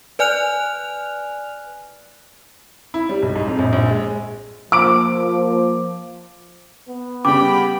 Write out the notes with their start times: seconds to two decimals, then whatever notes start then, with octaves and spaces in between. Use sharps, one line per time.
0.19 B4 D5 G#5 F6 F#6 F7
2.94 E4
3.09 G3
3.23 B1
3.36 G#2
3.47 F2
3.59 A#1
3.73 A#1
3.89 G#3
4.72 F3 A#3 D6 D7
6.88 B3
7.25 C#3 G3 G5 B5 D6